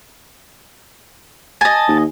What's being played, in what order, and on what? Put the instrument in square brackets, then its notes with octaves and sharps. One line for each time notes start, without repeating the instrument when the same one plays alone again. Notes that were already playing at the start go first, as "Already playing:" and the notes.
[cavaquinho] D#5 G#5 [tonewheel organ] A5
[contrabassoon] D#2